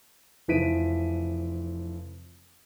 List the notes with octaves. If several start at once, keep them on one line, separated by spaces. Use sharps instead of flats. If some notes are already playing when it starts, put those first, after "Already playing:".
F1 E3 F3 B6 D7 D#7